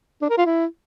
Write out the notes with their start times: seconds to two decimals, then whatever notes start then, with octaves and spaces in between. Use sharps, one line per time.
0.22 D4
0.30 A#4
0.38 F4
0.46 E4